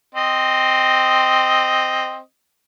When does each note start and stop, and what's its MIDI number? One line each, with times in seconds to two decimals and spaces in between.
0.15 2.19 60
0.15 2.19 75